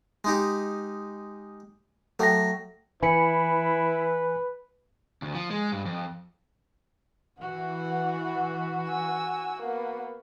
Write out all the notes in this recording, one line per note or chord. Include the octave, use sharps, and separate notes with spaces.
G#3 D#4 G4
F#3 A3 A4 G5 A#6
E3 E4 B4 G#5 B5 C#7
D2
F3
G#3
G2
F2
E3 F#4 F#5
G#5 E6
A#3 B3